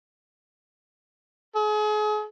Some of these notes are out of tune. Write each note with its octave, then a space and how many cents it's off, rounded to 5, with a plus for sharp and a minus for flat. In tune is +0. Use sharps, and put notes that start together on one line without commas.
G#4 +35